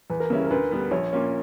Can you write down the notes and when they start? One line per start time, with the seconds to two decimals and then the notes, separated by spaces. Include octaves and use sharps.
0.10 E2 B4
0.20 A#4
0.30 C#3 G3 C#4 E4
0.46 A#4
0.51 D2 B4
0.71 D3 G3 B3
0.91 A#1 C#5
1.13 A#2 A#3 C#4